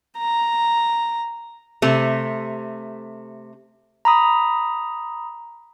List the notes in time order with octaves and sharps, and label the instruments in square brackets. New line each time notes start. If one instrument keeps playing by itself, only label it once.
[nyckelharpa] A#5
[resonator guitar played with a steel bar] C3 A3
[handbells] A#5 B5 D#6